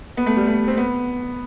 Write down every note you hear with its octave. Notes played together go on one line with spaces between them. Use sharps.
B3
A3
G3
A3
C4
B3